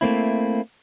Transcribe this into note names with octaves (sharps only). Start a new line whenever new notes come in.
A3 A#3 C4 E4